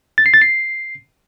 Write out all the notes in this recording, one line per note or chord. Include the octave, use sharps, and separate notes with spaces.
A6
C7
A6
C7